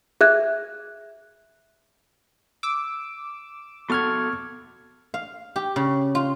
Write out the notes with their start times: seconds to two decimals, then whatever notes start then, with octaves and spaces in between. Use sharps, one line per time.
0.21 G#4 E5 F#6 G#6
2.63 D6 E6
3.90 B3 F#4 A4 C#6 F6 G#6
5.14 F5
5.56 G4
5.76 C#3
6.15 F4